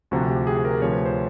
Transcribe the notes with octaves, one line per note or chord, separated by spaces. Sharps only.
D2 C3 F3 F#4
G4
G#4
A#4
D2 C3 F3 C#5
B4
C5